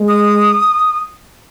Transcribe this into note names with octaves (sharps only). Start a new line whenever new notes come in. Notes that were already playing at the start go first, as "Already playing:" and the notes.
Already playing: G#3
D#6